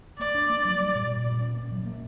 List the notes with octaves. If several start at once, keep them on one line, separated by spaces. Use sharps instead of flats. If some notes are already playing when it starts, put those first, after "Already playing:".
A#3 D5
D4
A#3
F#3
G3
A#2
A#2
A#2
C#4
A#3
F#3
A#3